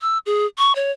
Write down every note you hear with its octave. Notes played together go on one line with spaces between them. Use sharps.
E6
G#4
C#6
C#5